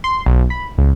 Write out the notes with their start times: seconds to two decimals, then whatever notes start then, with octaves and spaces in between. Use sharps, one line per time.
0.04 C6
0.26 B1
0.50 B5
0.78 C#2